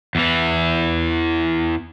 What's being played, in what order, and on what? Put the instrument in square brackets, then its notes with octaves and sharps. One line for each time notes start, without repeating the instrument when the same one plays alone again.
[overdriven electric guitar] E2 E3